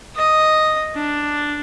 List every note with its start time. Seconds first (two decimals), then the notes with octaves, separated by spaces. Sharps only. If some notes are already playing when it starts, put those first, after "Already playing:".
0.15 D#5
0.95 D4